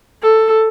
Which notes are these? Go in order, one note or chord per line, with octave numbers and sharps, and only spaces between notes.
A4